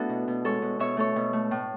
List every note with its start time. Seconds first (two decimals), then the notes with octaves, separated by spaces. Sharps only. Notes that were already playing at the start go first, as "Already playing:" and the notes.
Already playing: A3 B3 D4 E4 F#4 A4 B4 E5
0.09 B2
0.28 B2
0.45 G#3 A4 C#5
0.62 B2
0.79 B2 C#5 E5
0.97 A3 A4 C#5
1.16 B2
1.33 A3
1.51 A2